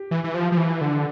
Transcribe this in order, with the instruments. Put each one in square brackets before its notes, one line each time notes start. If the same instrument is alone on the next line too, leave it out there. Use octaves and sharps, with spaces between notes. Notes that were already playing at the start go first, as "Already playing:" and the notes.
Already playing: [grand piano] G4
[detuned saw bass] E3
E3
F3
F3
E3
D3